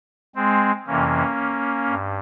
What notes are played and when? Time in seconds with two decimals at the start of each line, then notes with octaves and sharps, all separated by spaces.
0.35 G#3 C4
0.87 F2 C3 E3 A#3 C#4
1.89 G2